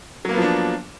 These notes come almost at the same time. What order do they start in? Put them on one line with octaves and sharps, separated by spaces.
F#3 A#3 B3 F3 D4